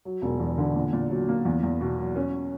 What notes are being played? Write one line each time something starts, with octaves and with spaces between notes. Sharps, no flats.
F#3
E1
E2
D3
A#2
A#2
F#3
A#3
E2
E2
B2
F#3
C#4